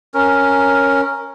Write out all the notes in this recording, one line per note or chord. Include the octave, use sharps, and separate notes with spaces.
C#4 A#4